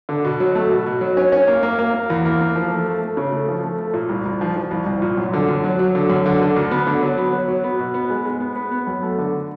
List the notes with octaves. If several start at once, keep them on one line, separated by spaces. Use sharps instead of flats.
D3
B2
F#3
A3
B2
B2
F#3
C#4
C#4
A#3
A#3
A#3
A#3
E2
A#3
A#3
F3
A3
A3
A3
C#3
A3
F3
A3
A3
A#2
C2
C2
F3
F3
C2
C2
A#2
F#2
D3
F#2
F#3
F#3
D3
F#2
D3
D3
D2
B3
D3
F#3
B3
F#3
F#3
B3
B2
B3
G#3
G#3
B3
B3
B3
F#2
A3
D3